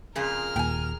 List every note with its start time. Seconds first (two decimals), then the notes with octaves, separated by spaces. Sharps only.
0.16 F2 A#2 C#3 G#4 A#4 F6
0.56 D#2 A#2 G5 G#5